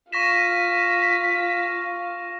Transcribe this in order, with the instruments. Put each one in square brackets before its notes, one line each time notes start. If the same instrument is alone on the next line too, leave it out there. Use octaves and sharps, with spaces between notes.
[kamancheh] F4 F5 [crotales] C#6 A#6 E7 [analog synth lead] B6